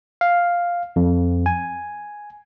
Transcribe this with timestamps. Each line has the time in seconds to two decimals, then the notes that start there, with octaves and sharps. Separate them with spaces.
0.21 F5
0.96 F2
1.46 G#5